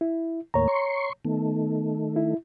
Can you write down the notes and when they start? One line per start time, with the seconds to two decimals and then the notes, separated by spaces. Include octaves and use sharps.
0.01 E4
0.54 D#2 A2 A#3 C#5 A#5
0.68 C6 C#6
1.25 D#3 A3 B3
2.16 E4